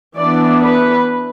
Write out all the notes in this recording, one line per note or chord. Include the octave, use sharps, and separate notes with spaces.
E3 B3 D4 D5
B4